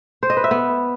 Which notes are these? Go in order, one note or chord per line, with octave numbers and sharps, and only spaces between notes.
C5
D#5
B4
E5
B3